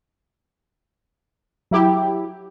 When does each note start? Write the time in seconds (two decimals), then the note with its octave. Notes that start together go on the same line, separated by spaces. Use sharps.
1.71 F#3 E4 G4